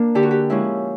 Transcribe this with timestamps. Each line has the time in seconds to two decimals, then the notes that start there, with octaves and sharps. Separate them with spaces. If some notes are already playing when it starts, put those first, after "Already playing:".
Already playing: A#3 D4 A#4
0.15 D3 G4
0.23 F#4
0.31 G4
0.50 F3 G#3 C#4 E4